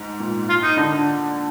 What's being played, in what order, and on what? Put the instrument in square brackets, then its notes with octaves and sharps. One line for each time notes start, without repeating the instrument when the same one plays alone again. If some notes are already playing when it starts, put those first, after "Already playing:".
Already playing: [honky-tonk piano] G#2
A#2
[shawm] F4
D#4
[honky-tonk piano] D3